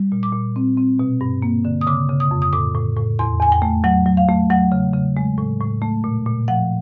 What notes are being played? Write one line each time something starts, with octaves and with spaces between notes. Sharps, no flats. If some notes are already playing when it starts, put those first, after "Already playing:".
Already playing: G3
A#2
D6
A#2
C4
C4
B2
G2
A#3
D3
D#6
C#3 D6
C#3
D#6
F2
D#6
A2 D6
A2
A2
E2 C6
E2 G#5
G5
A3
F#3 F#5
F#3
F5
A3
F#3 F#5
C#3
C#3
G#3
A2
A2
A3
A#2
A#2
F3 F#5